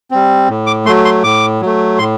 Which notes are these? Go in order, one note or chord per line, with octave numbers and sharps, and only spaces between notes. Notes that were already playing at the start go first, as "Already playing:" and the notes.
G3 C4
A2
D6
F#3 A3 C6
C6
A2 D6
F#3 A3
A2 C6